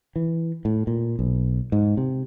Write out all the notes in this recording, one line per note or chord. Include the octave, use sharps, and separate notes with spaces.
E3
A2
A#2
B1
G#2
C3